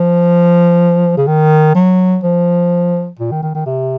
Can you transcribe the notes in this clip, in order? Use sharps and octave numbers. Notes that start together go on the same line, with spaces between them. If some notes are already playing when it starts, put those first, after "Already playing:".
Already playing: F3
C#3
D#3
F#3
F3
A#2
D#3
D#3
D#3
C3